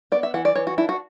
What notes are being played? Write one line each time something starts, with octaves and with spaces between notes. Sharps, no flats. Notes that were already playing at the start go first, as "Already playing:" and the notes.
B3 D5
E5
E3 F#5
D5
E3 C#5
F#4
D4 E4
F#4